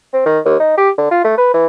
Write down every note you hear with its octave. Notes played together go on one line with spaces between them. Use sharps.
C4
D#3
D#2
D#4
G4
D3
F4
A3
B4
E3